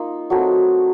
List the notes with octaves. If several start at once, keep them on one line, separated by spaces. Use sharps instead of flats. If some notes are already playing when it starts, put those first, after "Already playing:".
Already playing: A#3 D#4 F4
F#3 A3 C4 D#4 F#4